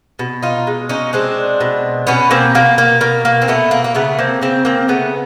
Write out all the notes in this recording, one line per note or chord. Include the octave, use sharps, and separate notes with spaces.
B2
D#4 F4
G#3
C#4 D#4
G#3 C4 D4
B2
B2 B3 C#4
A#3 C4
B2 A#3
A#3
B2 A#3
A#3
C4
B2 A3 B3
A#3
A#3
C#3 A3 B3
A#3 C4
C#3 A#3 C4
A#3 C4
C#3 A3 B3